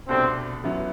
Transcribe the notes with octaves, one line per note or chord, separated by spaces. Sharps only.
C2 B2 A3 C4 D4
G1 F#2 F#3 B3 E4